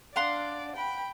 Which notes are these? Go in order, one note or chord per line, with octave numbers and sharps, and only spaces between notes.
D4 D5 F5 F#5 C6
G5 B5